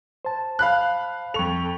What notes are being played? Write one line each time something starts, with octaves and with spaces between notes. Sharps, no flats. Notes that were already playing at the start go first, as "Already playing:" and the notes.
C5 A5
F5 B5 F#6
F2 A4 C#6 F7